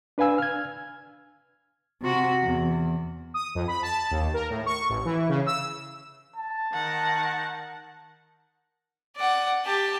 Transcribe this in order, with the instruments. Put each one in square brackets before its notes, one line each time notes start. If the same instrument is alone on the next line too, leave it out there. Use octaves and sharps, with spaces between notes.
[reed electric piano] D4 B4 F5 G#5 E6
F6 G#6
[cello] C3 F#4
E2
[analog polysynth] D#6
F2
B5
A5
D#2
A#4
A2
C#6
A1
E3
C#3
E6
[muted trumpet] A5
[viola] D#3 F#5
[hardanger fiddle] D5 F#5
G4 A5